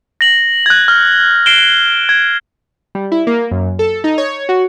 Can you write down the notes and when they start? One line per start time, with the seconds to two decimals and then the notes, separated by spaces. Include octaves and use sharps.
0.21 A#6 F#7
0.66 F#6 G#6
0.88 F6
1.46 C7 D7 E7 G7
2.09 G#6
2.95 G3
3.12 E4
3.27 A#3
3.51 F#2
3.79 A4
4.04 D#4
4.18 C#5
4.49 F#4